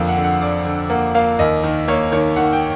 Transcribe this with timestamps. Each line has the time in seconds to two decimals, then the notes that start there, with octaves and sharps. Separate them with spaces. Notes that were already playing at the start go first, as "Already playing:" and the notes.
Already playing: F2 D3 A#3 F5
0.09 F#5
0.17 D3
0.24 F#5
0.41 D3 D5
0.65 D3
0.90 A#3 F#5
1.15 A#3 F5
1.39 D#2 D#5
1.63 D#3
1.88 A#3 C#5
2.12 D#3 C#5
2.36 D#3 F#5
2.53 G5